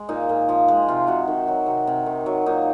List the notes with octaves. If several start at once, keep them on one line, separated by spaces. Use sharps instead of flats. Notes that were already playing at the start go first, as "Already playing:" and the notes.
Already playing: G#3
A#2 D#4
A#2
F3
G#3
C3 F4
C3 F#4
D#3
F#3 F#4
C3 F#4
C3
D#3
F#3
A#2 D#4